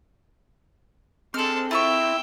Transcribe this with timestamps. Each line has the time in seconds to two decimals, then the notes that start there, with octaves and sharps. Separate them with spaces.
1.34 G#3 C4 D4 A4 F6
1.71 E4 F4 E5 G5 A5 C#6